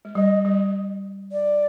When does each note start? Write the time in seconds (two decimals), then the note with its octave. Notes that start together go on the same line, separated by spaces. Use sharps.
0.05 G#3
0.15 G3 D#5
0.45 G3
1.32 D5